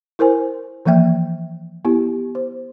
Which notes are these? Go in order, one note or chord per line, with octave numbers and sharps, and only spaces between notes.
E4 A#4 C5 G#5
E3 F3 A#3 E5 G5
B3 E4 G4
C5